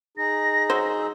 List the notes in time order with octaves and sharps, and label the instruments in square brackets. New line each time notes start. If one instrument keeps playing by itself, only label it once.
[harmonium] D#4 G#4 [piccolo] A#6
[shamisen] F#3 C5 [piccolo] E6